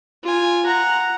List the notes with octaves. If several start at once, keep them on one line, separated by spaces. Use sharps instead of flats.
F4 G#5
F#5 A#5